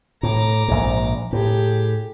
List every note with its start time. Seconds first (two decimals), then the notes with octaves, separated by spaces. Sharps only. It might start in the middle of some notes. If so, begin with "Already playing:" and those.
0.23 A2 A#5 D6
0.68 A#1 G#2
1.33 A2 G4 G#4